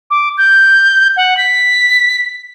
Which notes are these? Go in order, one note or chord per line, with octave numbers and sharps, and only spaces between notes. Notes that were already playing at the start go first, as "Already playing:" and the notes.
D6
G6
F#5
B6